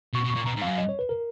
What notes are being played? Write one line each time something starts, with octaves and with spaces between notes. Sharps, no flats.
B2 C#6
B2
C#6
A#2
B2 A#5
G#2
F2 F5
F#2
D#5
C#5
B4
A#4